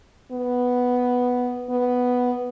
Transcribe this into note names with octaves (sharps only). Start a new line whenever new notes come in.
B3
B3